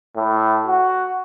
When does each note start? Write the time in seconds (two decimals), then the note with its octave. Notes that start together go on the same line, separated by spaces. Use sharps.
0.16 A2
0.67 F#4